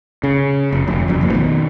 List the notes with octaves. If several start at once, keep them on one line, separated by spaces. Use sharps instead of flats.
C#3
F1
F1 D2
F#1 F2
A1 F2 A#2
B2 D#3